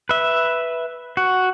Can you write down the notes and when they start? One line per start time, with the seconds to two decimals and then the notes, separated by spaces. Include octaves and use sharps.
0.09 B4 E5
1.17 F#4